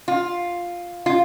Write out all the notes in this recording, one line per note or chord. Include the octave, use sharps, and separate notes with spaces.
F4
F4